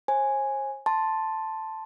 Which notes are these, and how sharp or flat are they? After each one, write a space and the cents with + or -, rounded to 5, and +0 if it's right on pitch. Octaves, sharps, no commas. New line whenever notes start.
C5 +45 G#5 -5
A5 +0 C6 +0